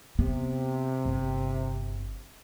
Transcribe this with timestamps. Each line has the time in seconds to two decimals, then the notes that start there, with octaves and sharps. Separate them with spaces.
0.19 C3 B3
1.05 G1